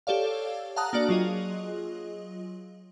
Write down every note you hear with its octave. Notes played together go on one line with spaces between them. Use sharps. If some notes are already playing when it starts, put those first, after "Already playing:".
G4 A4 C#5 D5 F5
F5 F#5 A5 A#5 D#6 F#6
A#3 D4 F#4 D5
F#3 F4 G#4 D#5